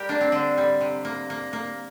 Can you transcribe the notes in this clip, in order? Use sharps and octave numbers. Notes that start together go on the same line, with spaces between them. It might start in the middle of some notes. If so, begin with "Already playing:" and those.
Already playing: G3 G4 A#4
A#3 D4
C4
D3 D4
G3
C3
A#3
A#3
A#3